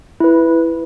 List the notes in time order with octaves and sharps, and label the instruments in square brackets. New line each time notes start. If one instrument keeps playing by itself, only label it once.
[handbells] E4 B4